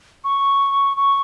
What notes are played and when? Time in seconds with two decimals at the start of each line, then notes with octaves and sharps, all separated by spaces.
0.24 C#6
0.97 C#6